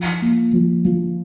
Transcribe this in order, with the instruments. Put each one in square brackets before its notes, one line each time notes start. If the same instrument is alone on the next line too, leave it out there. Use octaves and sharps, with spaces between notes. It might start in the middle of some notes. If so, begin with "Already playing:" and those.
Already playing: [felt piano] F3
A#3
F3
F3